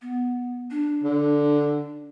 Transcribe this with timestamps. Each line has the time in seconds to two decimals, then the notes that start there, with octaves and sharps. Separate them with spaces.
0.02 B3
0.71 D4
1.03 D3